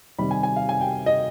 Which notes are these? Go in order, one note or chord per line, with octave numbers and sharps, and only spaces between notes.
C3 D#3 G3 B5
G#5
G#5
F5
G#5
G5
D#5